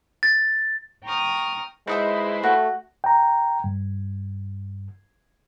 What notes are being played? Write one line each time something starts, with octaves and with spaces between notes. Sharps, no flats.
A6
G5 A#5 C#6 D#6 F6
G#3 D#4 E4 B4 C5 D#5 E5
A3 F#4
G5 A#5
G2